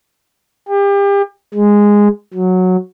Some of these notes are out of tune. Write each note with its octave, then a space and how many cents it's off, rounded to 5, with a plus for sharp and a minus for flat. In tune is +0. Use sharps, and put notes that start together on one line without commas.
G4 +35
G#3 -10
F#3 -10